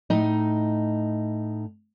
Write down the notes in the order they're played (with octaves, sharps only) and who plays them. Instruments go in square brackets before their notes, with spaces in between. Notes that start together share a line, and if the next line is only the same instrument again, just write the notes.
[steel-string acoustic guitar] A2 D#4